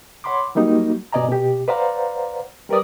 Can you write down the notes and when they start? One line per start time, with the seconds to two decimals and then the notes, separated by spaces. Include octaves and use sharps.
0.24 C#5 F#5 B5 C6 D6
0.55 F#3 G3 A#3 D#4 F#4
1.13 G2 B2 D5 D#5 G#5 A#5
1.29 B2 G4
1.68 B4 C5 D5 F5 F#5 A#5
2.69 G3 A#4 B4 D5 D#6